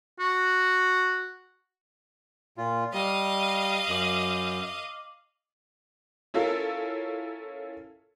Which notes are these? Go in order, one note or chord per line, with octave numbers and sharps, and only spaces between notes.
F#4
A#2 F4
G3 D#5 F5
F#2 D6 D#7 F#7
C#4 E4 F4 A4 A#4